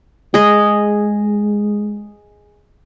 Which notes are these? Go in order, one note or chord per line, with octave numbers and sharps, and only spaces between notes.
G#3 G#4 D#5